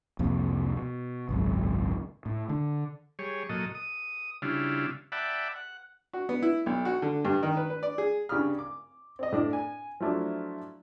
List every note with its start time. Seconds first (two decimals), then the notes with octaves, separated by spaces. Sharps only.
0.19 C2 F2 F3 A#3
0.77 B2
1.29 G#1 C#2 F#2
2.26 A2
2.49 D3
3.19 G3 G#4 C#5
3.49 A#2 F#3 A4 D#5
3.75 D#6
4.42 C#3 G3 D4 E4 F4
5.12 D5 E5 F#5 G5 A5 B5
5.56 F#5
6.13 F#4
6.29 B3
6.42 E4
6.66 B1
6.85 F#4
7.02 D3
7.25 G2
7.43 D#3
7.57 B4
7.70 B4
7.83 D5
7.98 G#4
8.29 G2 C#3 G3 B5 D#6 F6
8.59 D6
9.19 C4 D5 D#5
9.32 A2 D4
9.53 G#5
10.00 F3 F#3 A3 D4 E4